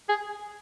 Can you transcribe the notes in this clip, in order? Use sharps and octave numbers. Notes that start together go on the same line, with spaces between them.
G#4